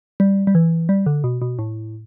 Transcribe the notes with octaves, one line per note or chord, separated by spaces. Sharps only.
G3
G3
E3
G3
D3
B2
B2
A2